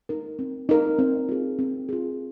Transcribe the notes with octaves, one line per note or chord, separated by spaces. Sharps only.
D#4 A#4
C4
D#4 A#4
C4
F4 G#4
C4
F4 G#4